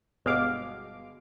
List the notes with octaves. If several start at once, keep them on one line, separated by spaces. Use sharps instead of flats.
G1 B2 G#3 F5 D6